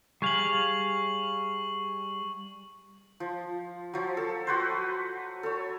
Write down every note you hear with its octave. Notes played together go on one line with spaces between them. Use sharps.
G3 G#4 F5 C#6 F#7
F3
F3 F#3
A4
F#4 B4 C5
A4 C#5